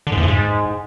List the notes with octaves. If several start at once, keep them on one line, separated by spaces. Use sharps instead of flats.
D3
G#2
E2
F2
G#2